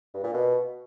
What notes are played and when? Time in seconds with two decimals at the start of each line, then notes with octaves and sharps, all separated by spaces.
0.14 G2
0.24 A#2
0.33 B2